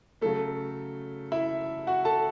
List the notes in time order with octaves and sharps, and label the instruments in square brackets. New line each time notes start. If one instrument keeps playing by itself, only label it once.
[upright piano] C#3 F#3 A3 A4
E4 E5
F#4 F#5
A4 A5